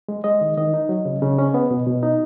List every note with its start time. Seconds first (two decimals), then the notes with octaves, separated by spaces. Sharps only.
0.08 G#3
0.24 G#3 D#5
0.41 D#3
0.57 D#3 D#5
0.74 D#4
0.89 F#3
1.05 C#3
1.22 C#3
1.39 C#4
1.54 B3
1.71 B2
1.87 B2
2.03 D#4